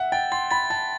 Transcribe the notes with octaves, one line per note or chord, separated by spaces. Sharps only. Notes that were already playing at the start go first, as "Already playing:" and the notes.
Already playing: E5 F#5
G5 A6
C6 A6
B5 A6
A5 A6